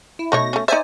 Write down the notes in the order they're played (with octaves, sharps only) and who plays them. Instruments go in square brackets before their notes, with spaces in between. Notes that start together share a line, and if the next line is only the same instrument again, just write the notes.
[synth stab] E4
[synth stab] B2 A#6 [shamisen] A3 D#4 C#5
[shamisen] A3 C#4
[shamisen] D#4 E5 [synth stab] C5 D5 G#5